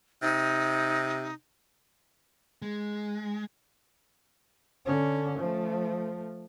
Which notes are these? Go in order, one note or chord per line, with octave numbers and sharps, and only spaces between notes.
C3 D#4
G#3
D3 C#4
F3 A3